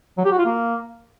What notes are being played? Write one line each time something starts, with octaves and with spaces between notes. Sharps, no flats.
F#3
G4
F#4
F4
A#3